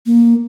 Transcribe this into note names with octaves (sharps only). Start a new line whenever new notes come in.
A#3